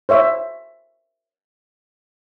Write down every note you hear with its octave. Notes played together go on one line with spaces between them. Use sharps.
C5 C#5 E5